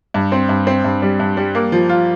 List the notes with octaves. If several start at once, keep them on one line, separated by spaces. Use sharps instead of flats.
G2
C4
G2
C4
G2
G3
G2
G3
A#3
F3
F4